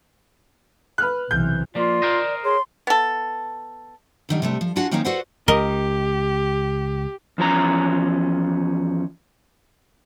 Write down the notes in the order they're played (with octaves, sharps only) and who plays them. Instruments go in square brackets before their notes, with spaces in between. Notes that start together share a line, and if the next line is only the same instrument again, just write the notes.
[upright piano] B4 F6 F#6
[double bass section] B1 C3 E3 [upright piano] G6
[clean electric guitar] F3 A#3 [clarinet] F4 [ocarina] D5
[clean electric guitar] A#4 C5 D#5
[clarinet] G#4 [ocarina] C#5 [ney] C6
[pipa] B3 A4
[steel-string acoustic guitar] D3 D#3 G3
C3 G3 A3
F3
D4 F4 F#4 F#5 G#5
D#3 A#3 C4 C#4 D#4 C5
F#4 A4 B4 C5 D5 F#5
[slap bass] C#2 [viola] G4 [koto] A#4 D#5
[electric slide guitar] E2 F3 C#4 A#5